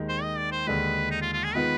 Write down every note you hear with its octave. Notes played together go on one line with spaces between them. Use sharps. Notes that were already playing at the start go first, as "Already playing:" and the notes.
Already playing: D#2 D#3 G#3
C5
D#5
D5
C5
D#2 D3 G#3 B4
D#4
F4
F4
G#4
D#3 G#3 B3 F4 B4